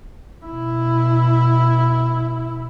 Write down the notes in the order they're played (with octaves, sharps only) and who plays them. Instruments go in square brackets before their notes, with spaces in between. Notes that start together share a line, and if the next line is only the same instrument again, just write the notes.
[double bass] B2 E4